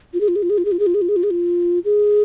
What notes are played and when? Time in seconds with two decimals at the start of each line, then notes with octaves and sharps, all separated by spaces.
0.14 F4
0.21 G#4
0.28 F4
0.36 G#4
0.43 F4
0.50 G#4
0.58 F4
0.65 G#4
0.72 F4
0.79 G#4
0.87 F4
0.94 G#4
1.02 F4
1.09 G#4
1.16 F4
1.23 G#4
1.31 F4
1.85 G#4